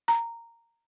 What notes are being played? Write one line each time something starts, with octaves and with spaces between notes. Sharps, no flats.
A#5